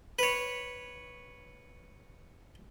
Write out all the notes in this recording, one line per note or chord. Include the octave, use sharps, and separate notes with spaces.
B4 C#5